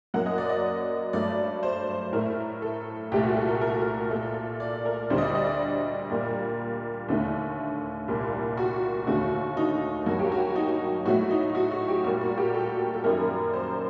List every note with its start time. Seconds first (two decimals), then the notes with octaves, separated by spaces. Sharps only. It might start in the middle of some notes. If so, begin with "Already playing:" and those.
0.14 F#2 F#3 A#3 F#5
0.26 D#5
0.38 D5
0.50 D#5
1.13 G2 F#3 A3 D5
1.63 C5
2.13 A2 A3 A#4
2.62 A4
3.12 C2 A#2 A3 G4
3.24 F#4
3.36 A4
3.49 A#4
3.61 A#4
4.11 A#2 A3 A4
4.60 D5
4.85 A#4
5.10 D2 D3 G3 C5
5.18 D#5
5.22 D5
5.35 D#5
5.47 D5
6.10 A#2 G3 A#3
7.09 D#2 D3 A3
8.08 C2 A#2 G3 A#3
8.57 F#4
9.07 D#2 D3 A3 F#4
9.57 D#4
10.06 G2 F#3 A#3 F#4
10.19 G4
10.32 F#4
10.56 D#4
11.05 A2 F#3 A3 F#4
11.30 D#4
11.55 F#4
11.71 F#4
11.88 G4
12.04 A#2 G3 A#3 F#4
12.21 F#4
12.38 G4
12.54 A4
12.94 A4
13.04 F#2 D#3 G3 A#3 A#4
13.54 C5